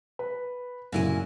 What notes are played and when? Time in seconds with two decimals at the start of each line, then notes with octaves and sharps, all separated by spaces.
0.19 B4
0.92 F#2 A#2 C#3 E4 G#5